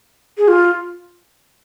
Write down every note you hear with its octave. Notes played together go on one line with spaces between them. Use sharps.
G#4
F4